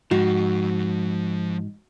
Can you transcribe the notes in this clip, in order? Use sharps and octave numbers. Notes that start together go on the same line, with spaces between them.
G#2 F3 F#4 G5